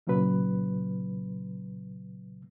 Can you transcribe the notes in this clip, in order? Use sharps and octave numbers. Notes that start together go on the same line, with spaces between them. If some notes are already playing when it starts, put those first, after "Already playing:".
C2 A#2 C#3 F#3 B4